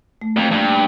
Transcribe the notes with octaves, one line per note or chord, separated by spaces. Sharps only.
A3
F2 A#3
G2